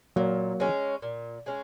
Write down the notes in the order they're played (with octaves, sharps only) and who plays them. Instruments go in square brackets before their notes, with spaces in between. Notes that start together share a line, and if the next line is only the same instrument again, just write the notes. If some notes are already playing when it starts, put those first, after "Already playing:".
[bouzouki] A#2 [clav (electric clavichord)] F#3 A#3
[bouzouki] G#3 C#4
A#2
G#3 C#4